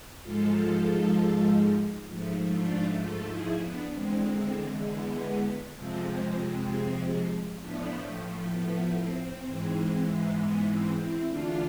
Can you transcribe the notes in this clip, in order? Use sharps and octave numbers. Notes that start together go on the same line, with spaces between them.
G#2 F3 G#3 F4 A4
G#2 F3 A3
D4 F4
F4 A4
E4 G#4
B3 D4
E2 D3 G#3 C4
B3
F2 C3 F3 G#3 C4
A2 F3 A3 B3 D4
B3
C4
G#2 E3 G#3
B3
C4
C4 E4
E2 D3 A3 D4 F4